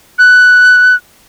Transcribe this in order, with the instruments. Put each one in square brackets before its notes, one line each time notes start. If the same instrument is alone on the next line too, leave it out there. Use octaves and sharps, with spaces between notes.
[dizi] F#6